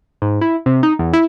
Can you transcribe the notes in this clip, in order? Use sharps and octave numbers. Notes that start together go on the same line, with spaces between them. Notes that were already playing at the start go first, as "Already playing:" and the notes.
G#2
E4
C3
D#4
E2
E4